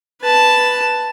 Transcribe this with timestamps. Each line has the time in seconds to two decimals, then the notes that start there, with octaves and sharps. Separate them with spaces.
0.21 B4 A5